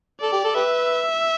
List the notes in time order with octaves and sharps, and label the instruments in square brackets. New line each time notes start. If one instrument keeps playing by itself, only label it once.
[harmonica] A4 [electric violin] D5
[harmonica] G4
A4
[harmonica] G4 B4 [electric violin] E5